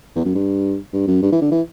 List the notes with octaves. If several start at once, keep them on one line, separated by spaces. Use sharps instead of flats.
E2
F#2
G2
G2
F#2
G2
E3
D3
E3